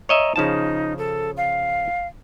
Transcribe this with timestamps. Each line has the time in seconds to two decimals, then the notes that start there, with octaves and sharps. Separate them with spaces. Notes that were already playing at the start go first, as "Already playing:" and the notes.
0.09 C#5 D#5 E5 A#5
0.36 C#3 F3 D#4 A5
0.98 A4
1.37 F5